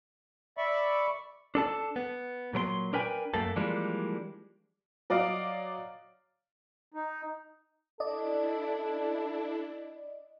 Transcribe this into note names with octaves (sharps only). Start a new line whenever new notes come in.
D5 E5 B5 C#6
D4 A4 A5
B3
A#2 F#3 A#4 C6
D4 A#4 B4 G5 G#5
F#2 A3 A#3 A4
E3 F3 G3 G#3 A#3 D4
F#3 D5 D#5 F5 D7
D#4
D4 E4 A4 D5 D#5